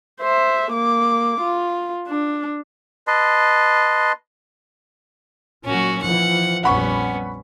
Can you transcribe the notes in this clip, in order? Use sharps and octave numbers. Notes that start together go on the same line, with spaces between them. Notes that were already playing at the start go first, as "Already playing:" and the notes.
C5 E5
A#3 D6
F4
D4
B4 D#5 A5 C6
A#2 F#3 C#4 F#4
E3 F3 F#5
A#1 F2 G3 B3 C#4 F#5 B5 C#6